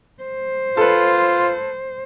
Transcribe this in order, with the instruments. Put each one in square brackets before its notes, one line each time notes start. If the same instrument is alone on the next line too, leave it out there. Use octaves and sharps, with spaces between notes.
[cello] C5
[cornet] F4 [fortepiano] A4 B4